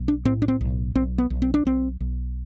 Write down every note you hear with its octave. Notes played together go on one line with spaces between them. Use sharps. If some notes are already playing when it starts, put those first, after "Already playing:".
Already playing: B1
D4
A2 C4
D4
C4
B1
B1 C4
B3
B1
C4
D4
B1 C4
B1